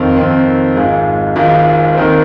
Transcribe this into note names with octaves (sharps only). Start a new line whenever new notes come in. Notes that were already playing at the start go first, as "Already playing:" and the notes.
Already playing: F2 D#3 C4
F2 D#3 C4
G#1 G#2 G#3 F4
G#1 G#2 G#3 F4
D#2 D#3 C4